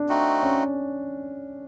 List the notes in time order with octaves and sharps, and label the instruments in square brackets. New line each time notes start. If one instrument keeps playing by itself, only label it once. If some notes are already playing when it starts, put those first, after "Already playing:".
Already playing: [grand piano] D4
[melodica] A3 C4 D#4 F#4
[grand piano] C#4